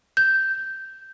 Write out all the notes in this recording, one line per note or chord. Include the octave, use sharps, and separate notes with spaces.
G6